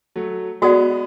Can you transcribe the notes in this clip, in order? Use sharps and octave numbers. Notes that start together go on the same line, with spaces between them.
F#3 A3
G#3 B3 F#4 A4 D5 F#5